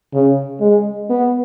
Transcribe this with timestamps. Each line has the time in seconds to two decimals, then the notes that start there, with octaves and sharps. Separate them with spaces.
0.13 C#3
0.61 G#3
1.10 B3